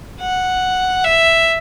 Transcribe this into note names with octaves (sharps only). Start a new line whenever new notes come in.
F#5
E5